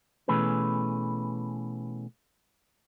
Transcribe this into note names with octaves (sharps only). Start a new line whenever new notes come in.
B2 E3 A3 C#4 G#4 B4